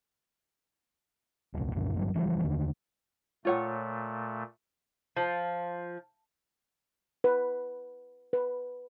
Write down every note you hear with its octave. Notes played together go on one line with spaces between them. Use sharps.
D#1 C2
C2 F#2 A#2 D3
G#1 G2 F#3
E1 E3 F3 G3
D#2 D3
A#2 A3 F4 C#5 F#5
F3
B4
B4